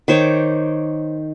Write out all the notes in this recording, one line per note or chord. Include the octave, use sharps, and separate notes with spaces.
D#3 C5 C#5 D6